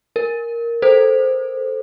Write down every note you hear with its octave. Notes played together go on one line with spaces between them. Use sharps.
A#4
A4 C5